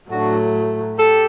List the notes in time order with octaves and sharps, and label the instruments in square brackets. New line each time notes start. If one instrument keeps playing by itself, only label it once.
[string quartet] A2 F#3 A3 [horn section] D4 F#4
[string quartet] G4 [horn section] A4